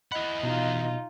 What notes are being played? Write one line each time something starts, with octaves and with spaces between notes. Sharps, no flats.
E3 D#5 F#5 B5
B2 D#4 F4